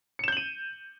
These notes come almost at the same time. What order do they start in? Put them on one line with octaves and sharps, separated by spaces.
C#7 E7 G6 F#7 D#7